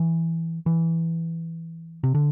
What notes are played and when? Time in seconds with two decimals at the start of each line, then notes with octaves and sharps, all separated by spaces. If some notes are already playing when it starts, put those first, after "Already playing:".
Already playing: E3
0.66 E3
2.04 C3
2.15 D3